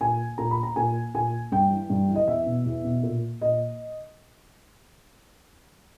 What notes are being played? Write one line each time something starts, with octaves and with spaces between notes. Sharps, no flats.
A#2 G#5
A#2 A#5
B5
A#5
A#2 G#5
A#2 G#5
G2 G5
E3
G2
E3
D#5
E2 E5
B2
E2
B2
A#2
A#2 D#5